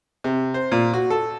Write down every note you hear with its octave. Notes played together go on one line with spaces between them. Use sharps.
C3
C5
A#2
F#4
A4